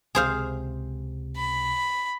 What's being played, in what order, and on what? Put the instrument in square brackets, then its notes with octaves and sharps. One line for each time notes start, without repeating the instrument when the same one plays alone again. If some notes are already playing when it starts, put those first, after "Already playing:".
[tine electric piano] C#2 C3 [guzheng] G#4 C5 F5
[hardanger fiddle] B5